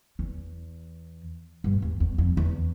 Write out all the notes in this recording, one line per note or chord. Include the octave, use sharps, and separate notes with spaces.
E2
G2
E2
E2
F2
E2